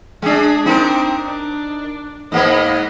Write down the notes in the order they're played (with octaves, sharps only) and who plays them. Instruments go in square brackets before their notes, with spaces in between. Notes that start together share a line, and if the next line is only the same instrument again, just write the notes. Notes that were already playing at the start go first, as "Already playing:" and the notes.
[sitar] G#3 D4 [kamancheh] G#4
[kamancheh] C4 D4 [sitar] D#4 A#4
[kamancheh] D4
[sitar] G#2 A#3 B3 [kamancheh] D#5